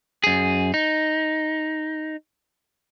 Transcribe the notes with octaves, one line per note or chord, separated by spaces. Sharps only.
F#2 G#4
D#4